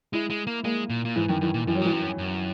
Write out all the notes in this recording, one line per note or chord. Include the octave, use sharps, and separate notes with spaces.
G#3 E4
G#3
A#3
G#3 A#3
A#2
A#2
G#2 E3
F#2 D#3
F#2 E3
A#2
F#2 E3
F#3
G#2 E3
F#2
F#2